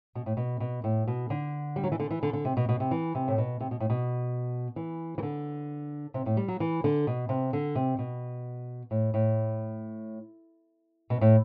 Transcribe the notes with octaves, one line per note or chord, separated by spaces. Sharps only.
B2
A2
B2
B2
A2
B2
D3
G3
F#3
E3
D3
E3
D3
D3
C3
B2
B2
C3
E3
C3
A2
B2
C3
B2
A2
B2
E3
E3
D3
C3
A2
G3
F#3
E3
D3
B2
C3
D3
C3
B2
A2
A2
B2
A2